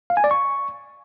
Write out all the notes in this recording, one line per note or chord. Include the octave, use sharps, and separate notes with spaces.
F5
G#5
D5
C#6